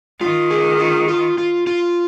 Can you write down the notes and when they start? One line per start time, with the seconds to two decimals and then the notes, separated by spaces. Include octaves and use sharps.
0.21 D#3 F4
0.50 G#4
0.80 F4
1.08 F4
1.38 F4
1.67 F4